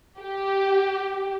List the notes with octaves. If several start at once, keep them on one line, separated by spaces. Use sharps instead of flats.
G4